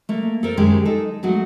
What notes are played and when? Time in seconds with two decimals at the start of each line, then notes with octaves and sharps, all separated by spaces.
0.09 A3 A#3
0.43 A4 A#4 C5
0.57 F#2 D#3 G#3 G4
0.85 D#4 A4
1.23 F#3 G#3 A3 F#4